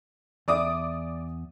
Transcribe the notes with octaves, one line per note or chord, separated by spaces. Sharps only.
E2 D5 E5 D6 D#6